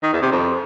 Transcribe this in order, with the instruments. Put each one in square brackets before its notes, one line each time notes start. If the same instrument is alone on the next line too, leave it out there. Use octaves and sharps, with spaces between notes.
[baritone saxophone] D#3
E2
C3
F2